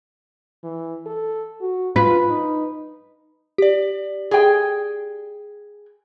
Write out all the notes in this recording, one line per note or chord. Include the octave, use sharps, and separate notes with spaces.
E3
A4
F#4
F4 B4
D#4
G4 D5
G#4 G5